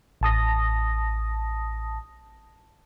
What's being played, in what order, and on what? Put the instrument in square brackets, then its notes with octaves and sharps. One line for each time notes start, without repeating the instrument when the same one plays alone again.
[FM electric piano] A1 A5 D#6 A#6